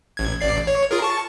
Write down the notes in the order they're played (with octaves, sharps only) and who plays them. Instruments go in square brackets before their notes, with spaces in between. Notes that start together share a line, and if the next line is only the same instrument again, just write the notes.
[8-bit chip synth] A1 G#6
A1 D5 C7
C#5
F4 G#4 A#4
A5 C#6